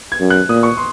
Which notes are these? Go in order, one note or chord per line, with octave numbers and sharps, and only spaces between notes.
G#6
F#2
F#6
A#2 D#6
C#6
C6